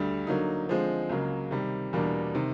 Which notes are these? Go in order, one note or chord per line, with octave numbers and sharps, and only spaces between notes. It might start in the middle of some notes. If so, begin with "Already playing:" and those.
Already playing: D2 D3 G3
D3 F#3 A#3 D#4
D3 F3 G#3 C4
C#2 C#3 F#3 A#3
C3 D#3 G3
E2 B2 G3 A#3 D4
C3 D#3